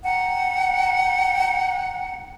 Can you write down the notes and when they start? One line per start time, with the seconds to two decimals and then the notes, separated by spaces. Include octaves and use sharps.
0.03 F#5 G5 A#5